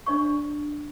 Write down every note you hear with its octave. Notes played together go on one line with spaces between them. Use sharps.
D4 D5 C#6